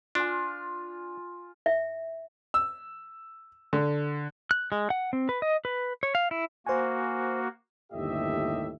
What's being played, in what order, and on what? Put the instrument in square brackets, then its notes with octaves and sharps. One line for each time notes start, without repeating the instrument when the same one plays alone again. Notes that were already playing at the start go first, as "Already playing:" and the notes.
[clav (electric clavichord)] D4 [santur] F4 G#5
[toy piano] E5
[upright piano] E6
D3
[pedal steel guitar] F#6
G#3
F#5
C4
B4
D#5
B4
C#5
F5
E4
[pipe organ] A#3 F#4 [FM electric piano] C5 G#5
[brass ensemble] G1 D#2 A2 G4 D#5 E5